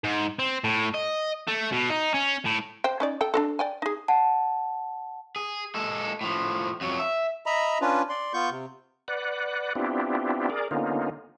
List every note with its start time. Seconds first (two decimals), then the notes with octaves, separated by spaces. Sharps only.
0.04 G#2
0.39 C4
0.64 A2
0.94 D#5
1.48 A3
1.73 B2
1.90 D#4
2.14 C#4
2.46 A2
2.84 C5 G5
3.00 C#4 D#4 D5
3.21 A4 G5
3.34 D4 F#4 A4
3.59 D5 G5 G#5
3.82 D#4 G#4
4.08 F#5 A5
5.36 G#4
5.75 G#3 A4
6.21 A2 F3
6.81 F2 F#3
6.99 E5
7.46 D#5 E5 A#5 B5
7.81 C#4 D4 F4 B4
8.09 D5 C6
8.34 B3 F4 C#6 G6
8.50 C3
9.08 B4 D5 F#5
9.75 B3 C4 D4 E4 F4 G4
10.50 G#4 A#4 D5
10.71 D3 A#3 B3 C#4 D#4 F4